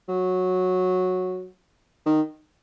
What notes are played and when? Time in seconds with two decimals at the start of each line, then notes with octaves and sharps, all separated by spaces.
0.08 F#3
2.06 D#3